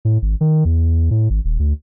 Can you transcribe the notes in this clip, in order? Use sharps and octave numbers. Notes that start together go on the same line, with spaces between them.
A2
G#1
D#3
E2
A2
G#1
D#1
D2